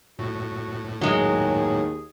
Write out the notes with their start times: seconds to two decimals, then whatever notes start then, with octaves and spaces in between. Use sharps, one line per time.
0.19 A2 F#4
1.01 D#2 F#3 G#3 G#4